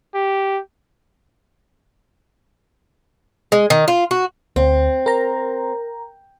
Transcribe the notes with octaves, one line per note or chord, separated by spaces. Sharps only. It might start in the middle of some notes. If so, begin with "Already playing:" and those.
G4
G#3
D#3
F4
F#4
D2 C4
A#4 A#5